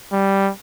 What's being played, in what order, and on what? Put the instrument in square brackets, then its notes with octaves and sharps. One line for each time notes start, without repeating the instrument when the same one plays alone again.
[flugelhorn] G3